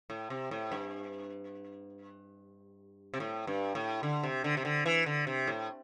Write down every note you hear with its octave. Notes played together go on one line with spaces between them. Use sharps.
A2
C3
A2
G2
C3
A2
G2
A2
D3
C3
D3
C3
D3
E3
D3
C3
A2